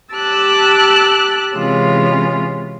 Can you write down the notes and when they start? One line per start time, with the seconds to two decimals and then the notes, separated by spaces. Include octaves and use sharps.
0.14 G4 A5 D6 E6 F#6 A6
1.53 C3 E3 G#3 C#4 F4